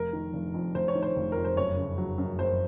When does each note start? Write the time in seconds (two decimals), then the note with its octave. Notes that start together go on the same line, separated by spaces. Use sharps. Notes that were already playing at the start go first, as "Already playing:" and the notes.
Already playing: F1 A#4
0.13 D#3
0.33 F1
0.54 F2
0.74 F1 C5
0.88 C#5
0.95 D#3
1.03 C5
1.16 F1
1.32 F2 A#4
1.45 C5
1.56 F#1 C#5
1.77 C#3
1.98 F#3
2.18 F#2
2.39 F#1 C5